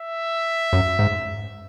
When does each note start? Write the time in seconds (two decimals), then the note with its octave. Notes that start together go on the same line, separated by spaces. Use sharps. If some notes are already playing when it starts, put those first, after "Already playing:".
Already playing: E5
0.73 F#2
0.99 G#2